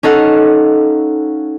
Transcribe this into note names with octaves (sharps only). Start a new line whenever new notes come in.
C#4 D#4 A4 D#5 F5 F#5